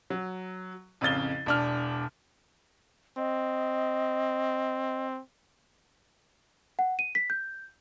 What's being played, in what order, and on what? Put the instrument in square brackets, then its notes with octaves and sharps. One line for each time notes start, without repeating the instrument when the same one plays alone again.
[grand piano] F#3
A1 F2 C#3 A6 G7
E1 D4 F6
[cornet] C4 [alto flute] D#5
[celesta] F#5
D#7
B6
G6